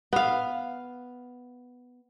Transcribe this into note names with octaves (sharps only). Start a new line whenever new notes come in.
B3 F5